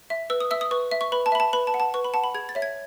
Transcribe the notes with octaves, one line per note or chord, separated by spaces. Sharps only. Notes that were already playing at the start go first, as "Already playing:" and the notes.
E5
B4 E6
D#6
E5 E6
D#6
B4 C#6
E5
C#6
B4 B5
A5
E5 B5
A5
B4 B5
A5
F#5
A5
B4 C#6
B5
F#5 A5
B5
G#4 G#6
A6
C#5 E5
G#6